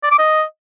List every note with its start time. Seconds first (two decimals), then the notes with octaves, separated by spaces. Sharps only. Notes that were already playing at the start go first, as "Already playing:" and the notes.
0.03 D5
0.11 D6
0.19 D#5